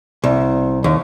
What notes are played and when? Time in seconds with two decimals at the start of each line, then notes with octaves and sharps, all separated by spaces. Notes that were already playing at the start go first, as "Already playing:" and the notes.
0.24 C2
0.84 D#2